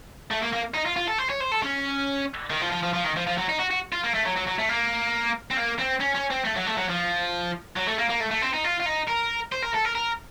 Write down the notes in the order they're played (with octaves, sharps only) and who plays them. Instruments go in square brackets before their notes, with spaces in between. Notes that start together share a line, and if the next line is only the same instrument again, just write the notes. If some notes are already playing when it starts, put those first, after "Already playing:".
[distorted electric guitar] A3
A#3
A#3
D#4
F4
F4
A4
C5
C#5
C5
A4
C#4
D#3
F3
F3
F3
F3
D#3
F3
F3
F#3
D#4
F#4
F#4
F4
A#3
A3
F#3
F#3
F#3
A3
A#3
C4
A#3
C4
C#4
C#4
C4
A3
F#3
A3
F#3
F3
F#3
A3
A#3
A#3
A3
A3
C4
D#4
F4
F4
D#4
A#4
C5
A#4
A4
A#4
A#4